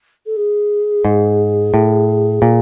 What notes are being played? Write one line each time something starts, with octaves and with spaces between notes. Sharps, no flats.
A4
G#4
G#2
A2
A#2